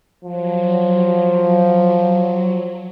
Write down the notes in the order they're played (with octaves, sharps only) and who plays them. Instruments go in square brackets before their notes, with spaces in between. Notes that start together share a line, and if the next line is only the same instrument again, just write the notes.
[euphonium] F3 [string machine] F#3